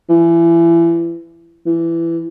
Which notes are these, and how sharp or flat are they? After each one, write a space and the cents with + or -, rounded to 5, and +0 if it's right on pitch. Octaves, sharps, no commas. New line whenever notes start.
E3 +30
E3 +20